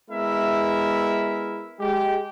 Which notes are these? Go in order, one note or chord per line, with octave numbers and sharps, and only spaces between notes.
G#3 B3 E4 A#4 E5
G#3 G4